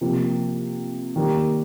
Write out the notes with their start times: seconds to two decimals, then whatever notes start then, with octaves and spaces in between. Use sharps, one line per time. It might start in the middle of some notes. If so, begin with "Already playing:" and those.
0.01 C3 F3 A#3
1.16 D#3 G3 A#3